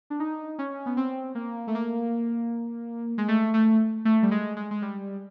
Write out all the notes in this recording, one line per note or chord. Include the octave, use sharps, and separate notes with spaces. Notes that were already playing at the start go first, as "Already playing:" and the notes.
D4
D#4
C#4
B3
C4
A#3
A3
A#3
G#3
A3
A3
A3
G3
G#3
G#3
G#3
G3